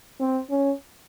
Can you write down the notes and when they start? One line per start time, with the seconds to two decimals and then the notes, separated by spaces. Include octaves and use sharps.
0.20 C4
0.50 C#4